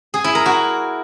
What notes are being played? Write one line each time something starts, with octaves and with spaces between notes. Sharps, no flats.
G#4
E4
A#4
F#4